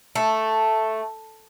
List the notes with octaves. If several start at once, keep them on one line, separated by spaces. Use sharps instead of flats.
A3